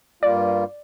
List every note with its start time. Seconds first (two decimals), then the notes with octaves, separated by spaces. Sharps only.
0.23 G2 G3 A#3 F4 D5